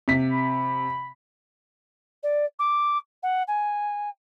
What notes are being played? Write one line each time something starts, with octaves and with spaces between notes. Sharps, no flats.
C3 B6
B5
D5
D6
F#5
G#5